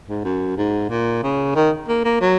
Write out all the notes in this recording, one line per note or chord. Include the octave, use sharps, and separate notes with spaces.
G#2
F#2
G#2
A#2
C#3
D#3
A#3
A#3
F#3